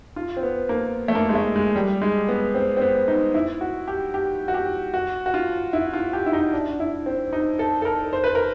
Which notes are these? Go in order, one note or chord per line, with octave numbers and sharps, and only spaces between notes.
F4
C4
B3
A#3
A3
A#3
G#3
A3
G#3
G3
G#3
B3
C4
C4
B3
D#4
E4
F#4
G4
G4
F#4
G4
F#4
F#4
F4
E4
F4
G4
E4
D#4
D4
E4
C4
D#4
A4
A4
A#4
C5
B4
A#4